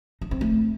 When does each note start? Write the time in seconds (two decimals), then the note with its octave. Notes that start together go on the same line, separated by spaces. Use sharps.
0.21 D#4
0.31 C4
0.41 A3